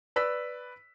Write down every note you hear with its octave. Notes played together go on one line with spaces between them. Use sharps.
B4 D5 E6 B6